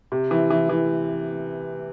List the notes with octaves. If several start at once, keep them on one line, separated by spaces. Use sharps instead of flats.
C3
E3
E3
E3